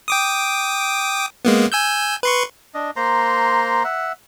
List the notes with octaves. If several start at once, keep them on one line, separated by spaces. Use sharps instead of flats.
G5 D6 D#6
G#3 A#3 B3
G#5 E6 G6
B4 C6 C#6
D4 D#5
A#3 C5 A#5 C6
E5 F#5